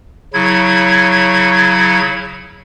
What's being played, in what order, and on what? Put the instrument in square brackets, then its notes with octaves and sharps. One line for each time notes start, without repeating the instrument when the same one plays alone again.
[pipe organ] C#3 F#3 E4 G#6